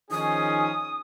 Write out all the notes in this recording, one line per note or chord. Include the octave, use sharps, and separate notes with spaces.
D#3 F3 C#4 D#4 G#4 G#5 D#6